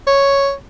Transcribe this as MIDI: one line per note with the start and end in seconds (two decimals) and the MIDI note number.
0.07 0.52 73